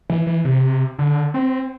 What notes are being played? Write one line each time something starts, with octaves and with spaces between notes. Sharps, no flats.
E3
E3
C3
D3
C4